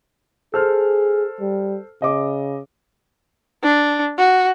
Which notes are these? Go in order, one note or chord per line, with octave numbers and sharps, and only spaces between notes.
G#4 A4 C5 F6
G3
C#3 D#5 D6
D4
F#4